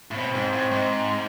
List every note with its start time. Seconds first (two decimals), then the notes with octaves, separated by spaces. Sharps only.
0.11 A2
0.16 B2 C4
0.35 G#2
0.53 A2
0.71 G#2